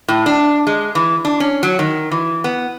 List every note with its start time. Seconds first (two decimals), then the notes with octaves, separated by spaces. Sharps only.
0.08 A2
0.26 D4
0.67 G#3
0.95 E3
1.25 D4
1.40 C#4
1.63 F#3
1.79 D#3
2.11 E3
2.44 B3